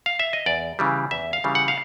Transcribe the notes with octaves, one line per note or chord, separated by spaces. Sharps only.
F5
E5
D#5
E2 D5
C#3 E3 G3
E2 E5
F5
C#3 E3 G3
F#5
F5